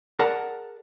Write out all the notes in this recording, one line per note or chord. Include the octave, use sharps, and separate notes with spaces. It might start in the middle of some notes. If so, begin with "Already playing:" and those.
G#4 A#4 D5 F#5 A5 A#5